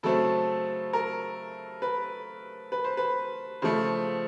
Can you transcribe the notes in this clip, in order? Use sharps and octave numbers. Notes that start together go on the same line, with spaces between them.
C#3 F#3 A3 C4 A4
A#4
B4
B4
C5
B4
C#3 F3 A3 C5